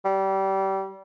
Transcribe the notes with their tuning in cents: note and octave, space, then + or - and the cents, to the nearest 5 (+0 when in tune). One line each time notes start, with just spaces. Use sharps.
G3 -25